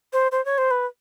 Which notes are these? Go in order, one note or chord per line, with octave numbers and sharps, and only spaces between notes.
C5
C5
C#5
C5
B4